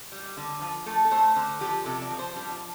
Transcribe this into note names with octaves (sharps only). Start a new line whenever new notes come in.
G3
D3
F3
A3 A4
A4
A3 C5
D3 C5
F3 G4
C3 A4
D5
F3
C5
G3 D4
F4